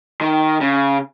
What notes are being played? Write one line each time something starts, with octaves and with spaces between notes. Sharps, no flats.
D#3
C#3